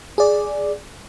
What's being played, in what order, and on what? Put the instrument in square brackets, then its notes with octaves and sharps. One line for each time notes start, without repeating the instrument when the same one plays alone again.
[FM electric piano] G#4 D5